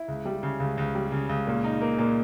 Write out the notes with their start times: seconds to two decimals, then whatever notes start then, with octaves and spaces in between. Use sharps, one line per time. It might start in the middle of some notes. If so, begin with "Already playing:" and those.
Already playing: E4
0.08 C#2
0.25 G3
0.43 C#3
0.60 C#2
0.77 C#2
0.95 G3
1.12 C#3
1.29 C#2
1.47 A#2
1.64 D#4
1.81 A#3
1.99 A#2